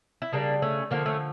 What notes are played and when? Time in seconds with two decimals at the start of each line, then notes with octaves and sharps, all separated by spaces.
0.22 E4
0.32 C#3 G3 A#3 D4
0.62 A3 C#4
0.91 D3 F3 A3 A#3
1.06 A3 C#4